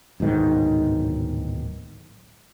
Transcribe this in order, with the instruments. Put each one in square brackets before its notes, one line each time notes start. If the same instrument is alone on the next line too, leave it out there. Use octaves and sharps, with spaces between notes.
[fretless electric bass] D1 B1 G#2 D#3